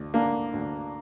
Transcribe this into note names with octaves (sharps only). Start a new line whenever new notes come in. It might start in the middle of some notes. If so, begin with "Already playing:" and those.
Already playing: D2
D3 A#3
D2